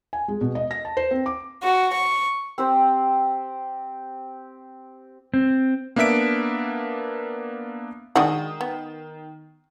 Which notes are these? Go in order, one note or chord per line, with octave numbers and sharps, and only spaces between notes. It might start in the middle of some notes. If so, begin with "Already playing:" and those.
G#5
G#3
B2
D#5
A#6
A5
C5
C4
D6
F#4
C#6
C4 G4 C5
C4
A#3 B3 D4 E5 B6 D7
D#3 G#3 D4 F#4 D#6
B3